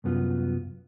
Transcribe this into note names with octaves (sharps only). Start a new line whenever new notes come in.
C2 F#2 B3 F4